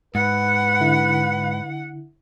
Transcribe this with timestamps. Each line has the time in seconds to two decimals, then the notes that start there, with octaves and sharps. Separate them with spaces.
0.15 G#2 B4 F#5
0.80 D3 E4